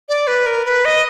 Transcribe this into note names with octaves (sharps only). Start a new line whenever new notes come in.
D5
B4
A#4
B4
D#5